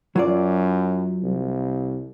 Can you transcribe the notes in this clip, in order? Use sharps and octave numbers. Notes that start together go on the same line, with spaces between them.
F#2 F#3 F4 D5
C2